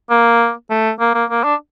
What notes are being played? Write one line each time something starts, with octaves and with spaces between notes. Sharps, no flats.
A#3
A3
A#3
A#3
A#3
D4